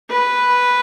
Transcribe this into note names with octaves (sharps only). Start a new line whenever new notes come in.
B4